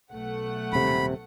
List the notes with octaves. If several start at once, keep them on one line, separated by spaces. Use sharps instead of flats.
B1 A3 F#5
D#1 C3 B5